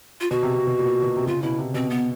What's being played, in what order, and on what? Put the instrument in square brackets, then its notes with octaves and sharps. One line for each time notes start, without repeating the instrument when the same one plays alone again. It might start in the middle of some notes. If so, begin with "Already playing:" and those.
[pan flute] F4
[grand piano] B2 [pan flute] F#4
[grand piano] C3
C3
B2
A#2
B2
C3
[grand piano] C#3 [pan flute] F4
[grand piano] B2 [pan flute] E4
[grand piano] C3
[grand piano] B2 [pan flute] C4
[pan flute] B3